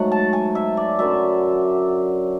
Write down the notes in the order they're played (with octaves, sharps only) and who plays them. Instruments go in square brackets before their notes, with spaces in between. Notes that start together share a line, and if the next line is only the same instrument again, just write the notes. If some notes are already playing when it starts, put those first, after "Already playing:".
Already playing: [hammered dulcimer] G#2 F#3 A3 F#5
A5
G#5
E5
D5
F#2 D3 F#3 E5